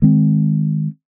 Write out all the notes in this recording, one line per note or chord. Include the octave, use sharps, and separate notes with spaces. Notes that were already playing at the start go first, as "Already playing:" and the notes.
D#3 G#3 C4